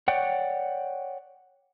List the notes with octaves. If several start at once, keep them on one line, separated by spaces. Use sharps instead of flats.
C#5 D5 F#5 G5